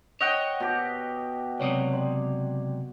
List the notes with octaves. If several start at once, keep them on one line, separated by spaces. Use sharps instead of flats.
C#5 D#5 F#5 G5
B2 G4
C#2 C3 F#3 C#5 D5 D#6
D5 C6